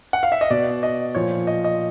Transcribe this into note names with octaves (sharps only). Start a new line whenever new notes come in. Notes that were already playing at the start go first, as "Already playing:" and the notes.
F#5
F5
E5
D#5
B2 D5
D#5
A#2 F3 C#5
D#5
D#5